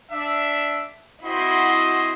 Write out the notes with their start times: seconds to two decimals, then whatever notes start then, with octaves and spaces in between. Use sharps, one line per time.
0.12 D4 E5
1.24 C4 E4 F#4 D#5 C6